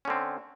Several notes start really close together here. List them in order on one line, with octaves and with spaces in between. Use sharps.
C#4 D3 C4